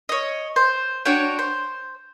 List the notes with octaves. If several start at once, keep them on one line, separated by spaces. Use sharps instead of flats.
C#5 D#5
C5
D4 F#4 C#5 G5
C5